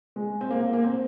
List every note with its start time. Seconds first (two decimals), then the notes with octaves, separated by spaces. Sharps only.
0.16 G#3
0.41 C4
0.51 A#3
0.61 A#3
0.73 A#3
0.84 C4